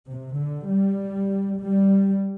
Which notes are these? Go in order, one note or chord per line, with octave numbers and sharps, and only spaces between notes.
C3
D3
G3
G3